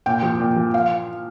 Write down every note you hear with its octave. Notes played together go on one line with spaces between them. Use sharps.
A#2 G5
F3
A#2
F3
F5